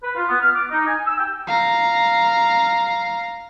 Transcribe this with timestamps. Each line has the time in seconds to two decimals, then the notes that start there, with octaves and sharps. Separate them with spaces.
0.03 B4
0.15 F4
0.29 B3
0.42 F6
0.55 D6
0.70 D#4
0.86 G#5
1.06 E6
1.18 G5
1.48 F5 A#5